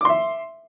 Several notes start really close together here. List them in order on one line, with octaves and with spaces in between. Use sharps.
D6 C6 E5